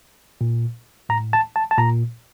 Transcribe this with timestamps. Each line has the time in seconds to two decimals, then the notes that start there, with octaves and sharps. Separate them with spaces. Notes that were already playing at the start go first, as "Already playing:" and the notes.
0.41 A#2
1.09 A2 A#5
1.33 A5
1.56 A5
1.71 A5
1.78 A#2 A#5